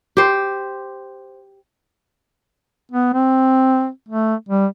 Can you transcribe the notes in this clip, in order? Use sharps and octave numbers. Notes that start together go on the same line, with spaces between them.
G4 C5
B3
C4
A3
G3